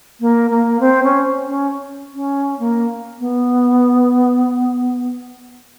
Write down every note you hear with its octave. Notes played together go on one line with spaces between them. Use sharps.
A#3
A#3
C4
C#4
C#4
C#4
A#3
B3